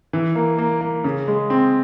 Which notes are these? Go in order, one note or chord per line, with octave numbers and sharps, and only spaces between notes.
E3
A#3
A#3
A#3
C#3
G#3
C4